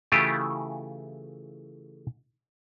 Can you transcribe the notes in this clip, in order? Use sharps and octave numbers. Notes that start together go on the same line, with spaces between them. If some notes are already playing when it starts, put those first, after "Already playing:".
C#3 E3 A3 E4 F4 G4